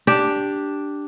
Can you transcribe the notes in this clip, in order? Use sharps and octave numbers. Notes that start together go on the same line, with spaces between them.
D4 G4